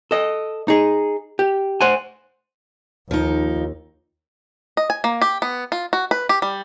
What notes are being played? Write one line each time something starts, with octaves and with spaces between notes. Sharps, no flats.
A4 D#5
D#4 G#4
G4
C5 F#5 G#5
D#2 F3 D#4
D#5
G#5
A#3
G4
B3
F4
F#4
B4
G4
G3